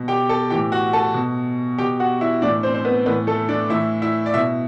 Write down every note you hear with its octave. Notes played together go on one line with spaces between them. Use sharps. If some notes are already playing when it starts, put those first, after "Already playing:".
Already playing: B2
G4 G5
A4 A5
A2 E3 G4 G5
F#4 F#5
A4 A5
B2
B2 G4 G5
F#4 F#5
E4 E5
A2 E3 D4 D5
C4 C5
C5
B3 B4
A2 E3 B3 B4
A3 A4
D4 D5
A2 E3 E4 E5
E4 E5
D5
B2 E4 E5